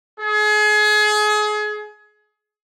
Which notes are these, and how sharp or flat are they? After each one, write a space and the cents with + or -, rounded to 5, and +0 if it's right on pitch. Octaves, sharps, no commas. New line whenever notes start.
G#4 +30